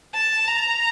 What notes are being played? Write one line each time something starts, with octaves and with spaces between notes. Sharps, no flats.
A5
A#5